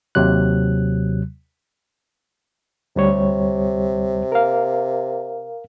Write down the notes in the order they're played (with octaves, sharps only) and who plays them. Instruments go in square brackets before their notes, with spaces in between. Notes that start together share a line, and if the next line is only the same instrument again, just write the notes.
[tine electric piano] D#2 C3 F#3 F#6
[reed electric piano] D2 G3 C#5 [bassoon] C3
[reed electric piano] A#4 F5